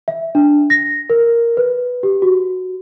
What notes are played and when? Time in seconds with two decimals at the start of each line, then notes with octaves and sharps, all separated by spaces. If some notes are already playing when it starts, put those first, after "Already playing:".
0.08 E5
0.35 D4
0.70 A#6
1.10 A#4
1.57 B4
2.03 G4
2.22 F#4